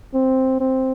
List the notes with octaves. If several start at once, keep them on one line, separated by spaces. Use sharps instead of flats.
C4
C4